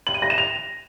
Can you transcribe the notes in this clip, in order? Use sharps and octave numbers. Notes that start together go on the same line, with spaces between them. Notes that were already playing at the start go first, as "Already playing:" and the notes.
F#7
D#7
A#6
E7
F7